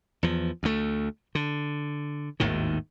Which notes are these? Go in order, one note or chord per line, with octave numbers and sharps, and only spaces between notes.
E2 F3
D2 A3
D3
G#1 D#2 A2 D#3